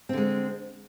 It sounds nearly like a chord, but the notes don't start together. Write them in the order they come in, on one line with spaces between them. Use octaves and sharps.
C4 D3 G#3